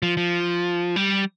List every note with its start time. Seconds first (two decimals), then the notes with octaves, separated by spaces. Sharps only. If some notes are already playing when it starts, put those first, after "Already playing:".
0.03 F3
0.17 F3
0.96 G3